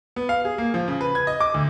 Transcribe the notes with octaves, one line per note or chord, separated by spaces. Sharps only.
B3
F5
G#4
A#3
F3
C#3
B4
G#6
D#5
D6
D2